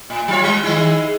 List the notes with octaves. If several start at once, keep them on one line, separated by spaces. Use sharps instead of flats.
A2
F#3 F4 C#5
G3
D#3 G#3 E4